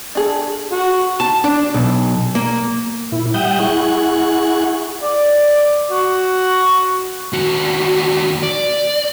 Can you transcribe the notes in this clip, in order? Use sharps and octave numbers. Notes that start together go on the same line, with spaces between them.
D4 G#4 A4
F#4
A5
D4
B1
A#3
A#2 E4
G3 E5 F#5 G5 D#6 G6
E4 G#4 F#5 C#6
D5
F#4
D#2 F#4
D5